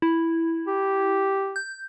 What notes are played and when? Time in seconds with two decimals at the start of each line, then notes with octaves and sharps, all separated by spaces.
0.02 E4
0.67 G4
1.56 G6